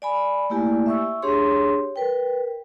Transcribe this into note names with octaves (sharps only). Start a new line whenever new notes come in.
D5 G#5 B5
A3 A#3 E4 G4 D5 G#5
E5 C#6 E6
D4 G4 G#4 C#5 C6
A#4 B4 G5